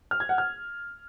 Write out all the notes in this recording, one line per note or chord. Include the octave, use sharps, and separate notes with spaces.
F6
G#6
F#5
F6